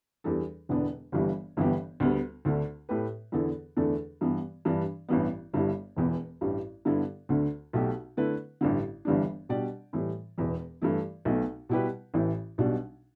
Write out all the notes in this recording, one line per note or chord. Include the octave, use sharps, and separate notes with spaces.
E2 E3 G3 D4 A4
E1 E2 D3 B3 D4
G1 G2 E3 G3
G1 G2 E3 B3 G4
D2 D3 G3 B3
D2 D3 A3 D4
A2 A3 G4 B4
E2 D3 B3 E4 A4
E2 D3 A3 D4 A4
G2 E3 B3
G2 E3 G3 D4
A1 G2 E3 B3
G1 G2 G3 E4
E1 E2 E3 B3
A1 G2 G3
G2 D3 B3 E4 A4
D2 D3 A3
B1 B2 A3 G4
D3 A3 E4 B4
A1 G2 D3
G1 G2 E3 G3 D4
B2 G3 D4 G4 D5
A2 E3 G3
E1 E2 E3
G2 E3 A3 E4
B1 B2 A3
B2 G3 E4 G4 B4
A1 A2 E3
B1 B2 G3 D4